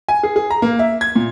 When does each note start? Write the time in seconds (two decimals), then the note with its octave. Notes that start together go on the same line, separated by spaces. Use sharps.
0.08 G#5
0.23 G#4
0.36 G#4
0.50 A#5
0.62 A#3
0.79 E5
1.01 G#6
1.15 A#2